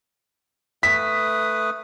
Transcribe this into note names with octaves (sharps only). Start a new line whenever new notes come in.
A3 B4 D#6 B6